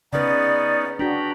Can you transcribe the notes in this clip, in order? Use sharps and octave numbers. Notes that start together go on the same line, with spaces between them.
C#3 B3 C#4 D#4 B4 D5
D4 F#4 G5 A#5 B5